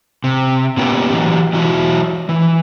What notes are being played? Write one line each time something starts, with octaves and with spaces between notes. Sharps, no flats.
C3
A#2 A#3 B3 C#4 G4
E3 F#3 G4
E3 F#3 E4 F#4
E3